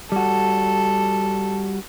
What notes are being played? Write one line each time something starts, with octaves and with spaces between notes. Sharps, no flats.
G3 F#4 A4